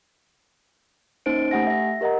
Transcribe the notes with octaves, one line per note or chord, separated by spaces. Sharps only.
A#3 C#4 D#4 C5 D7
A3 G4 F#5 G#5 A#6
E5 A#6
G4 A#4 D#5 F#5 A#5